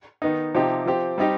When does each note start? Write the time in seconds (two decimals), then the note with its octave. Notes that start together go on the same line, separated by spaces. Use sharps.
0.22 D#3 B3 D#4
0.55 C3 F3 C4 D#4 G4
0.86 F3 C4 G4
1.18 G3 C4 D#4 G4